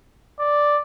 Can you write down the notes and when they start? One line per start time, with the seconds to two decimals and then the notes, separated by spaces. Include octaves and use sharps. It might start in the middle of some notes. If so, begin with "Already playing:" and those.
0.39 D5